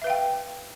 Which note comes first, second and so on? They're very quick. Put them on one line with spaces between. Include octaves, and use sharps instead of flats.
E5 B4 F5 G5